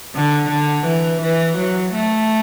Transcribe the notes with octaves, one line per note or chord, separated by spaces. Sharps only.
D3
D3
E3
E3
F#3
A3